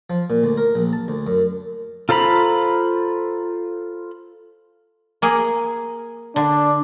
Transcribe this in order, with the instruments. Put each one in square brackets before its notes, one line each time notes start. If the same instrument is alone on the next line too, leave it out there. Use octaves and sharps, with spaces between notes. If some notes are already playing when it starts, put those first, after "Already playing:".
[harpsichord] F3
A#2
D2
A#4
A#1
A5
D2
F#2
[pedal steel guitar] F4 A4 C5 A#5 B5
[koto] A#3 G#4
[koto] D3 [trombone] D4